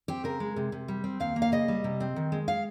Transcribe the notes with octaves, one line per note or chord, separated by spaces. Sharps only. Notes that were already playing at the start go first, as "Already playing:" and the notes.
C4 G4
C#3 A#4
G#3
C3
C3
G3
C4
D#2 F5
A#3
F5
C#3 D#5
G3
C3
C4
D#3
G#3
F5